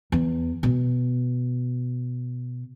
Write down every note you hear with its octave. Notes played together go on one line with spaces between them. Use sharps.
E2
B2